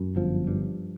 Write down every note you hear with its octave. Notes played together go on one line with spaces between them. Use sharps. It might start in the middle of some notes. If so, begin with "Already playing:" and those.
Already playing: F#2
G1 F3
G2